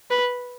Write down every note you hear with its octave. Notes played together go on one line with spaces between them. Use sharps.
B4